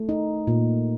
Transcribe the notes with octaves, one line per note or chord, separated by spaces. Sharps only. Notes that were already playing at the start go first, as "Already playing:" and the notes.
Already playing: A3
D#4
A#2